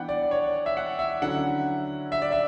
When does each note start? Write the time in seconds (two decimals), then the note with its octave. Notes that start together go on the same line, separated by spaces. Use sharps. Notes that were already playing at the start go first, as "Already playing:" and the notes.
Already playing: E3 B3 D4 F#5 G5
0.09 D5
0.31 C#5
0.66 E5
0.77 F#5
0.99 E5
1.22 D3 F#3 C#4 E4 F#5
2.12 E5
2.22 D5
2.32 E5